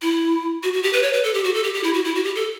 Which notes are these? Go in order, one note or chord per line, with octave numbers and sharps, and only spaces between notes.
E4
F#4
F#4
G4
B4
C#5
B4
A4
G4
F#4
A4
G4
G4
E4
F#4
E4
F#4
G4
A4